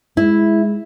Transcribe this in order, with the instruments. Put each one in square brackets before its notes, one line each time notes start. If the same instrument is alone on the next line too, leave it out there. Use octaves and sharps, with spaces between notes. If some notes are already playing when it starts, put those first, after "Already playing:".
[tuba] G#3 [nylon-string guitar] E4